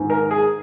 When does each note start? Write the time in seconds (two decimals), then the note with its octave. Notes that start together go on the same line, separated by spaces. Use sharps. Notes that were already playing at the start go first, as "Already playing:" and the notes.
Already playing: G#2 D#3
0.10 A#4
0.31 G#4